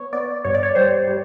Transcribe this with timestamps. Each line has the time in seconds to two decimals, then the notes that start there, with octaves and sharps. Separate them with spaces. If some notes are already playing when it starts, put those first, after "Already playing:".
Already playing: B3 C#5
0.13 B3 D5
0.45 G2 C#5
0.54 D5
0.63 C#5
0.75 G3 C5
1.08 G3